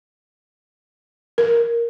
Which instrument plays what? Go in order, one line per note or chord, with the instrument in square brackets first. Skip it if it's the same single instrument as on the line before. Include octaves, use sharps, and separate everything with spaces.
[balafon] A#4